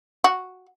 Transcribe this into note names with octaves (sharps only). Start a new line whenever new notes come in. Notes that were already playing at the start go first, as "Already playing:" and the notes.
F#4